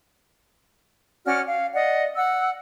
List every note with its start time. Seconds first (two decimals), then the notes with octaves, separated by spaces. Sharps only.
1.26 C#4 F#4 D5 F6
1.46 F5
1.74 D5 D#5 F#5
2.16 F#5 E6